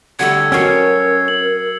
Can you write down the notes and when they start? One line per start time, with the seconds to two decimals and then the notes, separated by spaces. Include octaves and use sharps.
0.19 D3 G3 A3 F#5 E6 G#6
0.52 F#3 C#4 A#4 C#5 D#5 G#6 C7 C#7
1.28 F#7